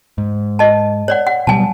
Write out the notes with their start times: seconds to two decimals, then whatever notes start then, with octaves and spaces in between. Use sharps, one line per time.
0.18 G#2
0.59 D#5 A5
1.08 C#5 D5 F#5
1.27 F#5
1.47 B2 F#3 G3 G#5 A5